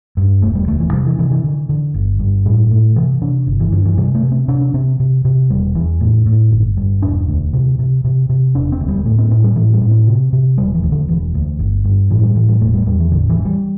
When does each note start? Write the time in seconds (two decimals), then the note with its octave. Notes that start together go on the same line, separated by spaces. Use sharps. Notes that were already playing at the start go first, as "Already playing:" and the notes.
0.17 G2
0.42 E1 A3
0.55 G3
0.68 D2 A3
0.80 E3
0.93 C3 G3
1.06 E3
1.19 C3 E3
1.31 E3
1.44 D3
1.69 D3
1.94 G1
2.19 G2
2.45 A2 G3
2.70 A2 A3
2.96 C3 E3
3.21 C3 D4
3.47 G1
3.60 E3
3.72 G2 D3
3.85 E3
3.98 C3 G3
4.15 A3
4.23 C3
4.32 C4
4.48 C3 D4
4.61 D4
4.74 C3 C4
5.00 C3
5.25 C3
5.50 E1 G3
5.75 E2 E3
6.01 A2
6.26 A2
6.51 G1
6.77 G2
7.02 E1 D4
7.28 D2
7.53 C3
7.79 C3
8.04 C3
8.29 C3
8.54 E1 D4
8.72 C4
8.80 D2
8.88 G3
9.05 A2 A3
9.18 C4
9.31 A2 C4
9.44 G3
9.56 A2 E3
9.73 G3
9.81 A2
9.91 C4
10.07 C3
10.33 C3
10.58 E1 G3
10.74 E3
10.83 D2
10.92 D3
11.08 E1 E3
11.34 D2
11.59 G1
11.85 G2
12.10 A2 E3
12.23 G3
12.35 A2 E3
12.49 G3
12.61 E1 A3
12.74 G3
12.86 E2 G3
13.00 E3
13.11 A1 D3
13.29 E3
13.37 G2
13.45 G3